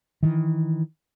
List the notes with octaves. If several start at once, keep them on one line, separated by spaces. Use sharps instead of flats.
D#3 E3